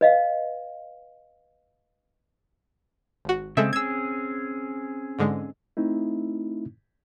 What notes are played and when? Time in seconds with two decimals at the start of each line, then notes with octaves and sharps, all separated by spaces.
0.01 B4 D#5 F5
3.25 G#1 F#4
3.57 C#3 G#3 C4 A4 E5
3.73 C4 C#4 G#4 E6 G#6
5.19 G#2 D3 G#3
5.77 A3 C4 D#4 E4